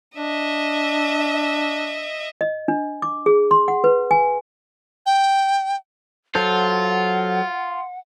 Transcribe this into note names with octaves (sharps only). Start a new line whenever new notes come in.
D4 D#5 E5
D#5
D4
D6
G#4
C6
F#5
B4
G#5
G5
F#3 F4 A4 C5 F#5